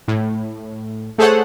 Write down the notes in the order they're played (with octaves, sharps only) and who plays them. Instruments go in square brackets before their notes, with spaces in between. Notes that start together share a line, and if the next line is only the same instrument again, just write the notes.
[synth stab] A2
A3 G#4 A4 C5 C#5 F#5